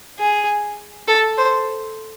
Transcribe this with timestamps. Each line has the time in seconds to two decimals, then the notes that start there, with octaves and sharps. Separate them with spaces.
0.19 G#4
1.07 A4
1.38 C5